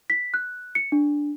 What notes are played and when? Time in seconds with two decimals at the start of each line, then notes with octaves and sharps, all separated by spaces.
0.10 B6
0.34 F#6
0.75 C#7
0.92 D4